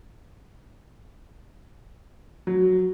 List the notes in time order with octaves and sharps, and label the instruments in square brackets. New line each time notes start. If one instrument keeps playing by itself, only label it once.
[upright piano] F#3